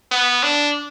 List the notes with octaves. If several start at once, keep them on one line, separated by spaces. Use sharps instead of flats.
B3
D4